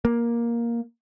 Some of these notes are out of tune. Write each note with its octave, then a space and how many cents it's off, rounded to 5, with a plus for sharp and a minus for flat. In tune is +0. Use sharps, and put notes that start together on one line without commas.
A#3 +10